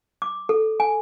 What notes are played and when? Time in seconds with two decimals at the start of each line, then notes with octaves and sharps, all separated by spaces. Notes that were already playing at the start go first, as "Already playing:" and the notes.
0.22 D6
0.49 A4
0.80 G#5